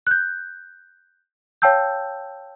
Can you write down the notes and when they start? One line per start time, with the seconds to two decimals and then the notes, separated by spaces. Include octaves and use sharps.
0.07 F#6 G6
1.62 C#5 F5 G5 A5 E6 G6